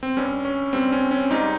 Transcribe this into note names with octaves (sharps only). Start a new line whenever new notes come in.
C4
G2 G3 C#4
C#4
G2 G3 C4
C#4
C#4
G#2 G3 D#4